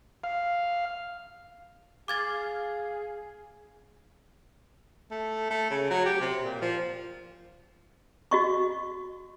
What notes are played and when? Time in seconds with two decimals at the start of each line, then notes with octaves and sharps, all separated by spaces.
0.24 F5
2.08 G#4 F5 D6 G#6 A6
5.11 A3
5.51 A3
5.70 C#3
5.91 F#3
6.06 G4
6.21 C3
6.43 A#2
6.62 F3
8.31 F#4 D#5 C#6